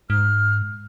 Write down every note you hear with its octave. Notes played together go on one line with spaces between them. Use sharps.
G#2 F6